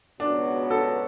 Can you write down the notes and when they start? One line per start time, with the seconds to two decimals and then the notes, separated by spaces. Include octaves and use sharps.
0.20 C#2 B2 F#3 B3 D4 F#4
0.71 A4